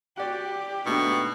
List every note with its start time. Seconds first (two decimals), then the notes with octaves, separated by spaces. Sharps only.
0.17 F#4 G4 D5 F#5
0.86 G#2 B2 A3 D4